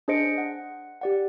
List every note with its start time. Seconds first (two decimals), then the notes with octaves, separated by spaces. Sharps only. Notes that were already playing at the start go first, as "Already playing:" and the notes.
0.08 D4 G#4 C5 D#5 C#7 D7
0.38 F#5
1.02 G4 D5 F#5